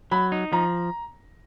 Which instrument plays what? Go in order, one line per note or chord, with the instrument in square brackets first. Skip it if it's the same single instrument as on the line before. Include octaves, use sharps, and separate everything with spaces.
[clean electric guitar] F#3 [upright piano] B5
[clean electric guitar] D#4
[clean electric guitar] F3 [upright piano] A#5